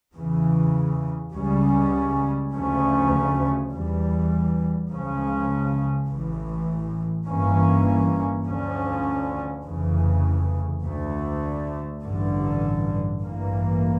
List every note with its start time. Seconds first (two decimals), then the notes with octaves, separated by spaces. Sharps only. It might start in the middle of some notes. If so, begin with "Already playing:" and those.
0.14 E2 C#3 E3
1.33 C#2 C#3 G3 C#4
2.52 D2 C#3 F3 A3 C#4
3.71 E2 E3 G3
4.90 C#2 C#3 F3 C#4
6.08 A1 A2 E3
7.27 G1 G2 E3 A#3 C#4
8.46 D2 D3 F3 C#4
9.64 F1 F2 C#3 E3
10.82 D2 D3 A3
12.02 A1 G2 D3
13.20 A1 G2 E3 A#3